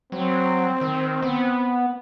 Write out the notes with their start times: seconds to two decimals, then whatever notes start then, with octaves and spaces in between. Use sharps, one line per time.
0.12 F#3 C4
0.81 D#3
1.23 B3